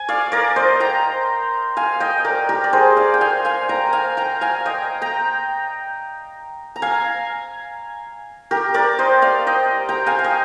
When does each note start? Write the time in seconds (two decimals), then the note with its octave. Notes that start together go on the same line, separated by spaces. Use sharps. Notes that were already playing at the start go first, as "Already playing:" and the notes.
Already playing: G#5
0.09 D5 F5
0.32 A#4 D5
0.56 C5 D#5
0.80 G5 A#5
1.77 F5 G#5
2.00 D#5 G5
2.24 A#4 D5
2.49 G4 A#4
2.64 D5
2.73 G#4 C5
2.96 D5 F5
3.14 G5
3.21 F5 G#5
3.45 F5 G#5
3.69 G5 A#5
3.93 F5 G#5
4.17 G5 A#5
4.41 F5 G#5
4.65 D#5 G5
5.02 G5 A#5
6.76 A#5
6.82 F5 G#5
8.51 G4 A#4
8.74 A#4 D5
8.99 C5 D#5
9.22 D5 F5
9.47 D#5 G5
9.89 G5 A#5
10.06 F5 G#5
10.19 G#5
10.24 D#5 G5